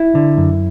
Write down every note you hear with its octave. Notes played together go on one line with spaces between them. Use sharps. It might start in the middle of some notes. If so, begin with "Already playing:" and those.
Already playing: E4
D3
F#2